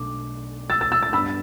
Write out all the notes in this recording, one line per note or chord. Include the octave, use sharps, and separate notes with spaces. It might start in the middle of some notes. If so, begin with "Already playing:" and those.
Already playing: B1 B2 A3 D4 D6
E6 A6
E6 A6
E6 A6
E6 A6
G2 G3 B3 D4 B5 E6